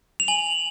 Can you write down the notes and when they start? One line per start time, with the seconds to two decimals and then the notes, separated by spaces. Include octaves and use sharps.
0.20 F7
0.28 G#5 F#7